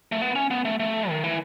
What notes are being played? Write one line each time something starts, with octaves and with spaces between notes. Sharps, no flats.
A3
B3
C#4
B3
A3
A3
D#3
E3